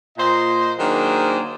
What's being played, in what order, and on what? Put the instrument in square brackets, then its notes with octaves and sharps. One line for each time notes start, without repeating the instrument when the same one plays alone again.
[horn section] A#2 C5 D#5
D#3 F#3 A#3 D4 G#4 C5